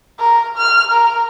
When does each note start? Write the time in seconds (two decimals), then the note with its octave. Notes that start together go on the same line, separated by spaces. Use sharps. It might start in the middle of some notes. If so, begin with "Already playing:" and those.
0.19 A#4
0.58 F6
0.91 A#4